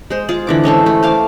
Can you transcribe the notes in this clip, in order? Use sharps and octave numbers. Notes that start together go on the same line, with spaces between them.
G#3 C5
F4 G#4
D3 E3 D6
G#3 C#4 A4 C5
A3
C5 F5 D6